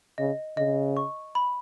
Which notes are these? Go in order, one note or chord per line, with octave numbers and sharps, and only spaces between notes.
C#3 D#5
C#3 D#5
C#6
B5